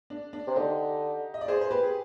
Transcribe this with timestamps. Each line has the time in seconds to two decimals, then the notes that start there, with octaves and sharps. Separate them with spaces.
0.10 D4
0.33 D4
0.47 C3
0.56 D3 D#4 G4
1.34 D#5
1.41 D5
1.48 G#4 C5
1.61 C5
1.71 G4 B4
1.83 G#4